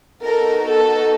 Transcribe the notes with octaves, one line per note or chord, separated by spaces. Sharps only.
B3 D#4 F#4 A4 A#4
A4